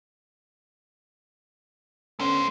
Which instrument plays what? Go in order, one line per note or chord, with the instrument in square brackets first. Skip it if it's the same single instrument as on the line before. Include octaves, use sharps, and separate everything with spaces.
[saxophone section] D3 B3 C#4 [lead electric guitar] A3 C5